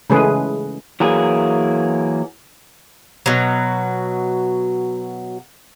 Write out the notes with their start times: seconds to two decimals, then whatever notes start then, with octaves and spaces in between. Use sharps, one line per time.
0.10 C#3 E3 G#3 A3 G#4 B4
1.00 E3 F#3 A#3 G#4
3.26 B2 F#3